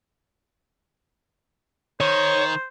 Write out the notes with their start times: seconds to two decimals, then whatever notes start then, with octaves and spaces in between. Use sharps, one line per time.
2.01 D#3 C5 C#5